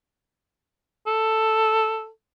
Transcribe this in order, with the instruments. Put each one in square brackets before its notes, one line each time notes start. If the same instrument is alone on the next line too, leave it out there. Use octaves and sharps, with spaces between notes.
[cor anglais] A4